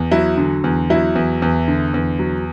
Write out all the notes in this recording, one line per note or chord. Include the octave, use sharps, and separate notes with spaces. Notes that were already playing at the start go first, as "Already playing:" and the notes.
Already playing: E2
F#3 E4
D3
E2
F#3 E4
E2
E2
D3
E2
F#3